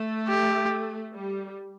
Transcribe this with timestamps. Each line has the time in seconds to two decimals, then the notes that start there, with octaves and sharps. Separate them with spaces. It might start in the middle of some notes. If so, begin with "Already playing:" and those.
Already playing: A3
0.29 G4
1.14 G3